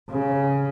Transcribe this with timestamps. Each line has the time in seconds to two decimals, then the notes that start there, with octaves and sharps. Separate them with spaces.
0.10 C#3